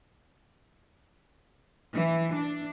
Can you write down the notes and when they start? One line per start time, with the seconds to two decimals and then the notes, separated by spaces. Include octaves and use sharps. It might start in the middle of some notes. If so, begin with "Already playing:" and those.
1.95 E3
2.36 D4